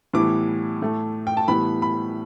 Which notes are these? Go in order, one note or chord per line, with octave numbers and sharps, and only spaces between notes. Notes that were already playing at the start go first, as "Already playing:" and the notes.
A2 E3 G3 B3 D6
A2 A3
G5
A5
A2 E3 G3 B3 B5
B5